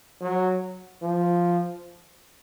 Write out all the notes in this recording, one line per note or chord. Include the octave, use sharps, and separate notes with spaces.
F#3
F3